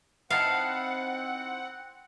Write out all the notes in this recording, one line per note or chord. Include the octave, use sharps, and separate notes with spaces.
C4 D#4 E4 F5 F#5 A5